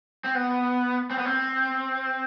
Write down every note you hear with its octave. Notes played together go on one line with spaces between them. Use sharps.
C4
B3
C4
B3
C4